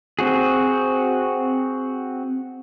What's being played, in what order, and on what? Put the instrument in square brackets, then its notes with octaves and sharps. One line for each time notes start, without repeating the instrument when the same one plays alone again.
[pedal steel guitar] C4 F#4 G#4